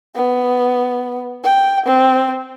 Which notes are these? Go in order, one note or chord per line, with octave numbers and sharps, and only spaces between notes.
B3
G5
C4